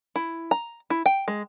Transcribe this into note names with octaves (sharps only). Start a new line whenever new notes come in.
E4
A#5
E4
G5
G#3